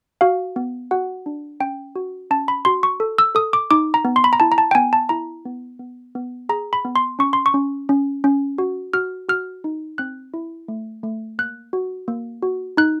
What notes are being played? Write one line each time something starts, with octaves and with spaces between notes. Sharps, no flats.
F#4 F5
B3
F#4 F#5
D4
C#4 G5
F#4
C#4 A5
B5
F#4 C6
C#6
A4
E6
A4 D#6
D6
D#4 D6
A#5
B3
C6
B5
A#5
E4 A5
A#5
A5
G5
B3 G#5
A5
E4 A#5
B3
B3
B3
G#4 A#5
B5
B3
C6
C#4 C#6
C6
C#6
C#4
C#4
C#4
F#4
F#4 F6
F#4 F6
D#4
C4 F#6
E4
A3
A3
A#3 F#6
F#4
A#3
F#4
D#4 F#6